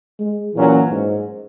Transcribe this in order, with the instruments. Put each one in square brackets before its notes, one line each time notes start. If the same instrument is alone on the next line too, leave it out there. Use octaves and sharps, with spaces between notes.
[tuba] G#3
[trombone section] A#2 F#3 C#4 [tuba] E3
[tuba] G#2